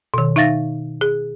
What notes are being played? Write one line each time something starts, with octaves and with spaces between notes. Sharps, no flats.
B2 D#3
D#4 E5 F5 A6 A#6
G#4